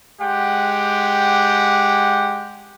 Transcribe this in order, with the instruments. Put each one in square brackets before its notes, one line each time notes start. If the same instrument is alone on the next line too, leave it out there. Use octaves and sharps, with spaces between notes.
[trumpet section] G#3 G4 F#5 G5 D6